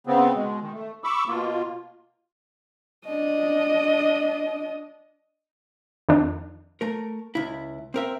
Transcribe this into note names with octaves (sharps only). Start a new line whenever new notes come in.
C#3 B3 C4
B2 G#3
D#3
A3
B5 C#6 D6 E6
B2 A#3 F4
D4 D#5
F2 D#3 D4
A3 A#4
C#2 E4
C4 A#4 E5